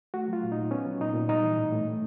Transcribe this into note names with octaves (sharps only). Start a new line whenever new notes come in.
A3 F#4
F#3 F4
A#2
D#4
A#2
B3 C#4
F#3
A#2 D#4
A#2
G3 D#4
E3
A2
A2
A3